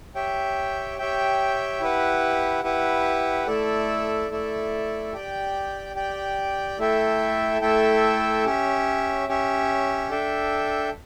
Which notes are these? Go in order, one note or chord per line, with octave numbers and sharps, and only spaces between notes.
G4 C#5 E5 G5
G4 C#5 E5 G5
E4 G4 B4 F#5
E4 G4 B4 F#5
A3 E4 A4 D5
A3 E4 A4 D5
G4 D5 G5
G4 D5 G5
A3 E4 A4 E5 G5
A3 E4 A4 E5 G5
C#4 G4 C#5 E5
C#4 G4 C#5 E5
D4 A4 E5 G5